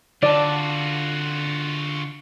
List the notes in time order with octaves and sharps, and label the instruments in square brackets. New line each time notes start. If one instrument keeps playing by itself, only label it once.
[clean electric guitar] D3 A5 [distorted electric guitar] F4 F#4 [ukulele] D5